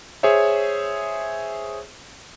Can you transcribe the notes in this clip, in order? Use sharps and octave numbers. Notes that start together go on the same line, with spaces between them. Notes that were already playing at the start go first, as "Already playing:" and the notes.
G#4 C5 C#5 E5